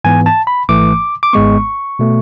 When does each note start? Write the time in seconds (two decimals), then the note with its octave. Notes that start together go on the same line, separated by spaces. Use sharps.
0.04 G#2 E3 B3 G#5
0.26 A5
0.47 B5
0.69 G#1 G#2 E3 A3 D6
1.23 D6
1.33 G#1 G#2 G#3 B3 C#6
1.99 B2 A3